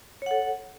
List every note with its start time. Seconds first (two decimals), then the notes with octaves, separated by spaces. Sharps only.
0.22 C#5
0.26 F#5
0.31 A4